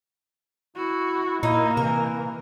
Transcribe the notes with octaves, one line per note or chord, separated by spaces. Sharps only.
E4 F#4
A#2 A#3 D#4 E4
C3 E3 A#4